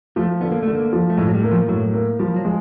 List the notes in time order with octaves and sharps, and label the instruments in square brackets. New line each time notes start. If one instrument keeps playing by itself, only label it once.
[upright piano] F3 [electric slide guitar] A3
[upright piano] D3 [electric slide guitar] B3
[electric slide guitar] A#3
[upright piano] D3 [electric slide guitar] A3
[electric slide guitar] A#3
[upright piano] F3
[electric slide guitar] A3
[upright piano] A2 [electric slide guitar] G#3
[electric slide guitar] F#3
G3
[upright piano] A#3
[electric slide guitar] F3
[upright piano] A2 [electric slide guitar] F#3
[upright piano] A#3
[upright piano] F3 [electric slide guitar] G3
[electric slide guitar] F#3
[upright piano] G#3